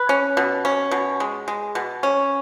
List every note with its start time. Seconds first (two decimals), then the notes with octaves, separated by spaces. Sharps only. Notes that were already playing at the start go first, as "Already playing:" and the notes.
Already playing: B4
0.09 C#4
0.37 B2
0.65 C#4
0.91 B2
1.20 G#3
1.48 G#3
1.75 B2
2.03 C#4